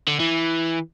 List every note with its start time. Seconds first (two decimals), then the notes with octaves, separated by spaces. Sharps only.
0.08 D3
0.20 E3